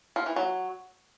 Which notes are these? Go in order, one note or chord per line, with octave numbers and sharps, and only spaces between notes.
F3
E3
F#3